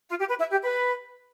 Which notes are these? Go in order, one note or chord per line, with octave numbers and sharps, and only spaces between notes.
F4
G4
B4
E4 E5
G4
B4